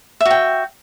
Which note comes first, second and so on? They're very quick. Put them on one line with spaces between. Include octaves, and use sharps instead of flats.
E5 F#4 G5